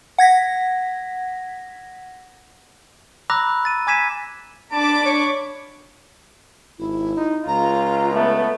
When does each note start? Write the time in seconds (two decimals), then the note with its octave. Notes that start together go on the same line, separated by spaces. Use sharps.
0.18 F#5 G#6 A#6 B6
3.30 A#5 B5 D6 E6 F#6 A#6
3.65 A6 D#7
3.87 G#5 D6 G#6 B6 D#7 E7
4.72 D4 A5 B5 D6
5.06 C#5 C#6
6.79 G#1 E4
7.17 D#4
7.48 C#2 F4 A#5
8.14 A3 B3